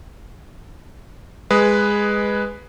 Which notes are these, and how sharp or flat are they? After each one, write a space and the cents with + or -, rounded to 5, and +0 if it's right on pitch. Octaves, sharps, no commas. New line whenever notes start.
G#3 -10 G#4 +0 B4 +0